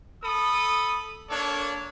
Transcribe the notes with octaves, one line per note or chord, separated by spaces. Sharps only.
A4 B5 D#6
A#3 D4 A4 C#5